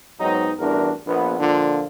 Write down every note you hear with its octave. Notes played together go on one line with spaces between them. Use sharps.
G#2 F#3 B3 C4 D#4
A1 E2 G2 D4 F#4 A#4
A#1 B3
A#2 D3 F3 F4